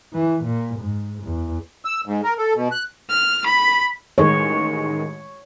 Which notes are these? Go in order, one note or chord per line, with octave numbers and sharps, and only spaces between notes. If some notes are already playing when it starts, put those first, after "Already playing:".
E3
A#2
G#2
E2
E6
G#2
A#4
A4
B2
F#6
F6
B5
A1 D#3 G#3 C#5